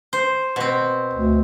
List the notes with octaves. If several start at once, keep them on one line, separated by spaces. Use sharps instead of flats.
C5
B2 C4
D2